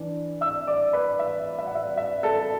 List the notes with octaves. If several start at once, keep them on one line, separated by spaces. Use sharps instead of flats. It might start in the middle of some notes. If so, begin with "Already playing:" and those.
Already playing: E3 D4
E5 E6
D5 D6
B4 B5
E5
E5
F#5
E5
E5
A4 A5